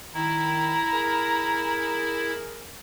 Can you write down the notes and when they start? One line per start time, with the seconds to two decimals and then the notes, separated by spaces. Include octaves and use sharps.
0.14 D#3 E4 A#5
0.93 G#4 A#4